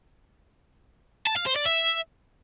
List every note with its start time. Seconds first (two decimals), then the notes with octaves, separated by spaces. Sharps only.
1.27 A5
1.37 F5
1.46 C5
1.56 D5
1.66 E5